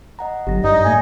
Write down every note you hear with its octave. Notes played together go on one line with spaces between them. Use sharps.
D#5 F#5 A#5
G1 F#3 G4 A#6
G2 D#4 D5 D#5
A2 A#3 E5 G#5 A#6